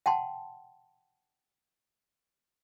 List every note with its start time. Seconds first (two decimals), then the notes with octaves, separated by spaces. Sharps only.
0.06 F#5 G5 A5 C6